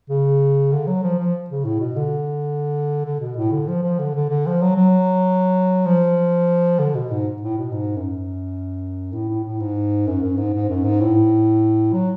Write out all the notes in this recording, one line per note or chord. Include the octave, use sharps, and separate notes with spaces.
C#3
D3
F#3
F3
F3
C#3
A2
B2
D3
D3
B2
A2
D3
F3
F3
D3
D3
D3
F3
F#3
F#3
F3
D3
B2
G#2
A2
B2
G#2
F#2
A2
A2
A2
G#2
F#2
F#2
G#2
G#2
F#2
G#2
A2
F#3